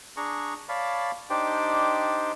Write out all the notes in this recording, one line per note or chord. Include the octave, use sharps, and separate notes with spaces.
D4 G#4 A#5 C#6
C#5 D5 F5 A5 B5
D4 D#4 G4 C5 D5 G5